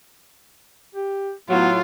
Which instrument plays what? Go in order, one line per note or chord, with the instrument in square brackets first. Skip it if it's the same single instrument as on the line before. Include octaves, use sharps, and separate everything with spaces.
[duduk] G4
[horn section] A2 F#3 [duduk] B3 [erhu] F4